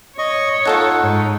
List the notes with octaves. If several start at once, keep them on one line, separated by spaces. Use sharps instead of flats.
C#5 D#5 C#6
D#4 F4 A4 F#5
G#2